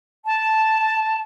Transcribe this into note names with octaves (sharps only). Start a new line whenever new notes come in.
A5